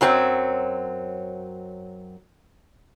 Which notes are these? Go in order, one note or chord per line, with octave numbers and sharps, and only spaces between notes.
F#2 F#3 C4